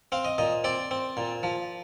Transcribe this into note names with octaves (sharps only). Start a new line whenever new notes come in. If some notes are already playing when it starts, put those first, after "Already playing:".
C4 F5
D#5
A#2 D#5
C4 D5
C4
A#2
F3